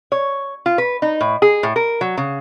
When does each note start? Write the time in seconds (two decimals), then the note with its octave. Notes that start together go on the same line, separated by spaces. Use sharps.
0.12 C#5
0.66 F4
0.78 B4
1.02 D#4
1.21 A2
1.42 G#4
1.63 A2
1.76 A#4
2.01 F#3
2.18 C#3